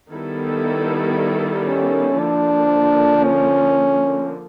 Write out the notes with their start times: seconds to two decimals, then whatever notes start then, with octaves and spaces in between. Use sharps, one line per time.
0.10 D#3 G3 B3 E4 A4
1.67 C#4
2.20 D3 F3 A#3 D4
3.24 C#4